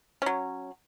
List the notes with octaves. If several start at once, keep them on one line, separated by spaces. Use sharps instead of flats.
F#3 C#4